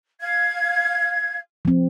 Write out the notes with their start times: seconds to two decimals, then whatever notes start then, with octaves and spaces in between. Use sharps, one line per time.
0.20 F5 G#6
1.65 F3 C4